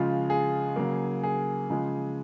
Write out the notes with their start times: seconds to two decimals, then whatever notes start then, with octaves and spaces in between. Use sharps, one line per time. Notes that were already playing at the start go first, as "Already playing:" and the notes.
Already playing: C#3 F3 G#3 F4
0.30 G#4
0.76 C#3 F#3 A#3
1.23 G#4
1.70 C#3 F3 G#3